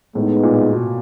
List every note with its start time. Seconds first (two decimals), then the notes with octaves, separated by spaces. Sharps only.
0.15 A2 G#3 B3 D#4
0.43 A#2
0.73 B2